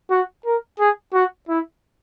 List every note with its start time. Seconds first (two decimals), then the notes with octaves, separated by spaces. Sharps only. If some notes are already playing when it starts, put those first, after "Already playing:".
0.10 F#4
0.45 A#4
0.79 G#4
1.14 F#4
1.49 E4